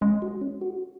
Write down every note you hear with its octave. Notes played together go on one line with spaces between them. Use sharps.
G#3 C#4
F#4
C#4
F#4